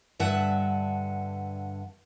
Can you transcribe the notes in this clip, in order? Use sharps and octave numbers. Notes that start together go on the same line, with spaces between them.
G2 D3 E5 F#5 A5